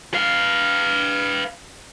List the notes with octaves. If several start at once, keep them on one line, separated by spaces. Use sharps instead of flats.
B4 F5